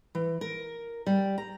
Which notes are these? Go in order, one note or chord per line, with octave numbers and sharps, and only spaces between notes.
E3
A#4
G3
A#5